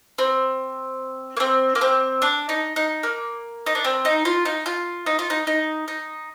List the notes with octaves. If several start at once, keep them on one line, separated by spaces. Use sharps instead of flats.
C4
A#3
C4
A#3
C4
D4
D#4
D#4
A#3
D#4
D4
C4
D#4
F4
D#4
F4
D#4
F4
D#4
D#4
D#4